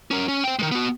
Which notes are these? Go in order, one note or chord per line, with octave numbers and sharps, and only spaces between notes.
C#4 A#4
C#4
C5 G5
D#3 G#3
B3 F#4